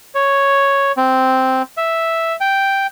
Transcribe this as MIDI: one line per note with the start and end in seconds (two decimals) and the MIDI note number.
0.15 0.92 73
0.97 1.62 60
1.77 2.36 76
2.41 2.87 79